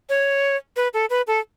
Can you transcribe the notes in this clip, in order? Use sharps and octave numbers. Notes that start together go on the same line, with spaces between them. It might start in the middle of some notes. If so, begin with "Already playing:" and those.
C#5
B4
A4
B4
A4